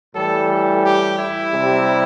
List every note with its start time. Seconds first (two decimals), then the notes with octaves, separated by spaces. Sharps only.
0.15 A2 E3 G3 A4
0.50 A4
0.84 G4
1.19 E4
1.53 C3 G3